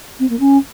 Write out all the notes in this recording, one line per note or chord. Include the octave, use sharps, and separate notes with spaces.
C4
A#3
C#4